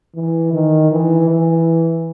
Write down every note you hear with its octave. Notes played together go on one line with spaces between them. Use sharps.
E3
D#3
E3
E3